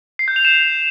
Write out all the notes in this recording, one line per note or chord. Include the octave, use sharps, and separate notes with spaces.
C7
G6
F7
E7